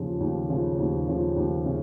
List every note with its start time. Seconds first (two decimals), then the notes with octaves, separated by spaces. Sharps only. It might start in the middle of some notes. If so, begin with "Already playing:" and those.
Already playing: D#2 C#3 F3
0.20 D#2
0.49 C#3 F3
0.78 D#2
1.07 C#3 F3
1.36 D#2
1.66 C#3